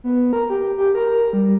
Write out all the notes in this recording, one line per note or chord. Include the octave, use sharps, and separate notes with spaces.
B3
A#4
G4
G4
A#4
G3